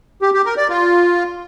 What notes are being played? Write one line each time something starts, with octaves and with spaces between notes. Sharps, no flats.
G4
G4
A#4
D5
F4